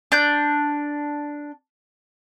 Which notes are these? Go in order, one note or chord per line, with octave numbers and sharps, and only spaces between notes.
D4 G6